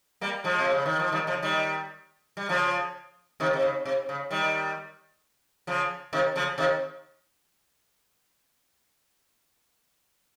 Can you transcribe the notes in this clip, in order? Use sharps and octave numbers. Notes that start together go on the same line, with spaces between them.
G3 A#3
F3 G#3
C3
C#3
D#3
F3
D#3 G3
C#3 F3
D#3 G3
G3
C#3 F3
C3 D#3
C3
C#3
C3
C#3
D#3 G3
C#3 F3
C3 D#3
C#3 F3
C3 D#3